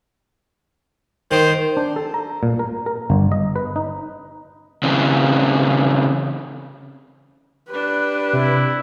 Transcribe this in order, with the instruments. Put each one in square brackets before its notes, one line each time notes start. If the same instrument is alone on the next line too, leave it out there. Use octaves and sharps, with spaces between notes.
[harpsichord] D#3 [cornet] C5
[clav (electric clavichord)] D4
A4
A#5
A#2
A#4
A#4
G1
D#5
B4
D#4
[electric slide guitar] C#3 E3 C4
[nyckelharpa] D4 G4 [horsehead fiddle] B4
[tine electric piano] C3 [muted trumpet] E4